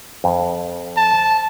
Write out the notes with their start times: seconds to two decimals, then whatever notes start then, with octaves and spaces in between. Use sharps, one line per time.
0.24 F2
0.97 A5